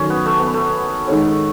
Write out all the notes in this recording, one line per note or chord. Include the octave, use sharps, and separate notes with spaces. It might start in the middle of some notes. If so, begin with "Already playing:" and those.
Already playing: D#3 F#3 A3 C#4
B3
A3
B3
A3
D#3 G#3 D#4 A4 C#5